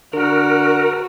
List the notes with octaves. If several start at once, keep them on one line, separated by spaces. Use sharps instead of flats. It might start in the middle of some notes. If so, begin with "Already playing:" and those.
D3 F#4 A#4